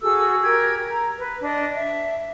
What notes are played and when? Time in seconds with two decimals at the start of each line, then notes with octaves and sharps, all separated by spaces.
0.02 F#4 G#4 A4 E6
0.43 G4 A#4 G#6
0.88 A#5
1.18 B4
1.42 D4 D#5
1.76 E5